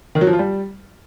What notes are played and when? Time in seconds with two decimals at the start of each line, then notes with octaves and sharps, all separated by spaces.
0.15 D#3
0.21 F#3
0.27 F3
0.33 F4
0.39 G3